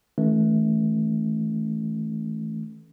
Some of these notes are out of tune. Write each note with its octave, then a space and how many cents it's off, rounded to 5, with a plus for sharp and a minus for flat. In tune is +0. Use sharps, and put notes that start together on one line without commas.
E3 -40 A3 -15 C#4 +0